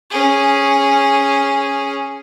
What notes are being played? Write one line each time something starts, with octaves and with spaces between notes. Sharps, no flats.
C#4 G#4